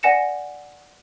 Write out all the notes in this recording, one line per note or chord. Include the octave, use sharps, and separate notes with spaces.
D5 F#5 G#5 A#6 C#7 E7